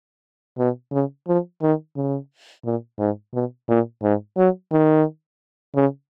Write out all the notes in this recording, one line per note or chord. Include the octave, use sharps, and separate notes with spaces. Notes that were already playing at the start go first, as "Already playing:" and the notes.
B2
C#3
F3
D#3
C#3
A#2
G#2
B2
A#2
G#2
F#3
D#3
C#3